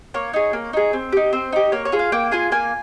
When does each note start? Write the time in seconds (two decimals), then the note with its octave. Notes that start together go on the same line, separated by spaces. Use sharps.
0.14 A#3 C#5
0.33 D#4 G#4
0.53 A#3
0.73 D#4 G#4
0.93 C4
1.12 D#4 G4
1.33 C4 C5
1.52 D#4 G4
1.72 A#3 C#5
1.85 C#5
1.92 F4 G#4
1.99 F5
2.12 A#3 G5
2.31 F4 G#4 G#5
2.52 A#3 G#5